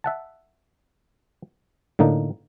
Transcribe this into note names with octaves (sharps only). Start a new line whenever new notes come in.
E5 F#5 A5
A2 D3 A#3 D#4